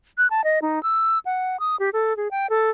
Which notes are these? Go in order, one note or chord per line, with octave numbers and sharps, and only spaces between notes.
F#6
A5
D#5
D#4
E6
F#5
D#6
G4
A4
G#4
G5
A4